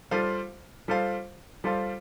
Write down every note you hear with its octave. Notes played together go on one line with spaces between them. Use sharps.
G3 F4 A4 C5 F5
G3 F4 A4 C5 F5
G3 F4 A4 C5 F5